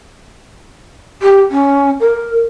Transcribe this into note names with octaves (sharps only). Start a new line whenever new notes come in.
G4
C#4
A#4